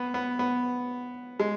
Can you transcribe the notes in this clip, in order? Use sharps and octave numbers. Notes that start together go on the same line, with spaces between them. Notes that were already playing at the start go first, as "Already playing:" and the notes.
Already playing: B3
B3
B3
G#3